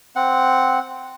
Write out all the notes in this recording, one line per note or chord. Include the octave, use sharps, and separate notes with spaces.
C4 F#5